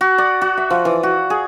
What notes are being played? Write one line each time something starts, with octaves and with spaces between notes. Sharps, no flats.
F#4
D5
F#4
E5
F3
E3
F#4
G#4